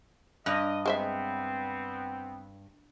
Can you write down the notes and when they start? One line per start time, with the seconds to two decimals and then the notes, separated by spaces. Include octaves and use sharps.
0.46 G2 D#5
0.86 G#3 B3 C4 C5 E5